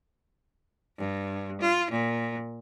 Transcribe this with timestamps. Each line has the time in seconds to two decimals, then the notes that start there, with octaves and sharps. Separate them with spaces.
0.97 G2
1.61 F4
1.91 A#2